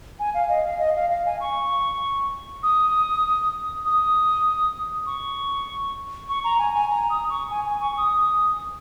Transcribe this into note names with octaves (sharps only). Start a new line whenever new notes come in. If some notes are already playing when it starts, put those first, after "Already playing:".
G#5
F5
D#5
F5
D#5
F5
F5
G#5
C#6
D#6
D#6
C#6
C#6
A#5
G#5
G#5
A#5
D#6
C#6
G#5
G#5
C#6
D#6